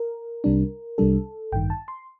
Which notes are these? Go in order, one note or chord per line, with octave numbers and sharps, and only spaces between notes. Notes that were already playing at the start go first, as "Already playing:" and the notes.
Already playing: A#4
C2 C3 G3 D4
C2 C3 G3 D4 A4
A1 G2 D#3 G5
A5
C6